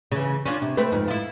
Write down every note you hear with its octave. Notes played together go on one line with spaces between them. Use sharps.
C#3 E3
C#4 D4 F4
C3
A3 C4 B4
F2 G#2
E4 F4